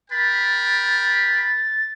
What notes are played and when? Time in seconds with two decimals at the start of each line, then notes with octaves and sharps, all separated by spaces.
0.11 A#4 G5 B5 A6